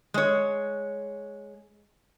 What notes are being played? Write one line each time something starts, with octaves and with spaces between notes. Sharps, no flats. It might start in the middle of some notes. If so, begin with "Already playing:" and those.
G#3 C#5